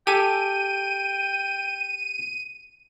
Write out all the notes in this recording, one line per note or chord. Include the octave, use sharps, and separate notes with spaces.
G4 A4 G5 G#5 D#7